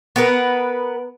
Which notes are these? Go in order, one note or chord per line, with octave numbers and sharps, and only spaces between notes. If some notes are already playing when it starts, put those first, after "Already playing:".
B3 A#4 B4